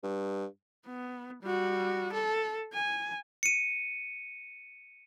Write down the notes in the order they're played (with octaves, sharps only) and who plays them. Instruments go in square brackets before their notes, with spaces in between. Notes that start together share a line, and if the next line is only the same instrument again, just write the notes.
[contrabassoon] G2
[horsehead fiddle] B3
G3 F#4
A4
G#5
[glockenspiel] C#7 D#7